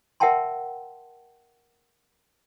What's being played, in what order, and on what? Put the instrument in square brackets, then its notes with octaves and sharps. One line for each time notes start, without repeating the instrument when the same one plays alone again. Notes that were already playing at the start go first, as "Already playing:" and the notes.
[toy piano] A#4 E5 F#5 G5 A5 C6